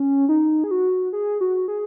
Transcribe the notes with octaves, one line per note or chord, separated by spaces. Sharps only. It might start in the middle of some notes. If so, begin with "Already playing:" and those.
Already playing: C#4
D#4
G#4
F#4
G#4
F#4
G#4